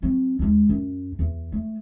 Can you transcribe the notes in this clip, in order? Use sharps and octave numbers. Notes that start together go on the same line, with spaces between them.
F#3 C4
D#2 G#3
F#2
E2
A3